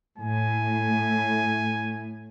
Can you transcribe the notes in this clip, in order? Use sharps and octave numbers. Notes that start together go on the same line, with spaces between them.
A2 G#5